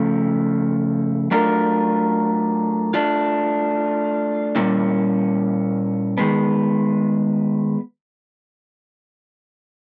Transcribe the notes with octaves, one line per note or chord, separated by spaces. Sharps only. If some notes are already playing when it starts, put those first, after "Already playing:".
Already playing: C#3 F3 A3
F#3 A3 D4 F4 A#4
A3 D4 F4
A#2 G3 A#3 C#4 E4
D#3 G#3 B3